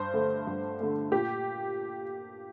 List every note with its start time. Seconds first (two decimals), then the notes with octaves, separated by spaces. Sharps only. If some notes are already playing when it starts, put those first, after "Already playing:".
Already playing: G2 C5
0.14 D3 A3
0.47 G2
0.80 D3 A3
1.12 A#2 G4